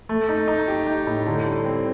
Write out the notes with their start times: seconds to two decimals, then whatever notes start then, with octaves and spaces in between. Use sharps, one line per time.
0.09 A3
0.29 D#4
0.48 D#4
0.68 G4
0.87 D#4
1.07 A2
1.26 D3
1.45 G3
1.65 C4